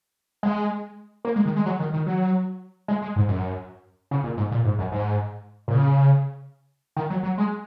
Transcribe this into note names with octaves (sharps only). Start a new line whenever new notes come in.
G#3
A#3
G#3
D#3
G#3
F#3
D#3
D#3
F#3
G#3
G#3
G#2
F#2
C#3
A#2
G#2
A#2
G#2
F#2
G#2
A#2
C#3
D#3
F#3
F#3
G#3